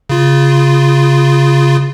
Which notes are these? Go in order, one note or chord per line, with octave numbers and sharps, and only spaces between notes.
C#3 F4